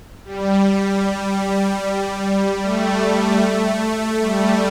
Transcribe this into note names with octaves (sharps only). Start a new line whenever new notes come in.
G3
A3
G3